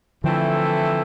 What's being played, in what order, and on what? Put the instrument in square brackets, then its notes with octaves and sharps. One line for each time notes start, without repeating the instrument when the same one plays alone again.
[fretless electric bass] D3 F3 [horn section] E3 A3 C4 E4 A4